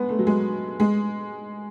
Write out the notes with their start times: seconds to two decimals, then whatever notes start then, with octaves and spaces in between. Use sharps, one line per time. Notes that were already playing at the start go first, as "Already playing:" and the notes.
Already playing: G#3 B3
0.09 A3
0.19 F#3
0.27 G#3
0.80 G#3